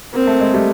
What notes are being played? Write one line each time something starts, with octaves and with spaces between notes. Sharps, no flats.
A#3 C4
A3
G#3
G3 A3